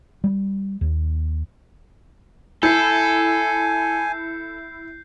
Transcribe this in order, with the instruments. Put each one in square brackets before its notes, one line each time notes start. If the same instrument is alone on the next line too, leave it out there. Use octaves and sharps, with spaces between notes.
[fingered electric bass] G3
D#2
[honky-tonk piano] E4 [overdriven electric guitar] A4 [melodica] G#5 [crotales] G6 C7